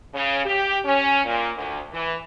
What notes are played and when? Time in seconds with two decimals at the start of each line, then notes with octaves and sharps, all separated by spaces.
0.13 C#3
0.44 G4
0.83 C#4
1.24 A#2
1.55 D2
1.92 E3